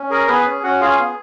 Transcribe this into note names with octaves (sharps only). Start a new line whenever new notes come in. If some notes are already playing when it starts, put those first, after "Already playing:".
Already playing: C#4
G#4 A#4
B3 G#4 B4
C#4
C#4 F#4 F#5
F4 G#4 F5
B3